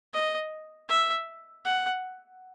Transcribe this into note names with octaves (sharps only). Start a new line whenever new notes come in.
D#5
E5
F#5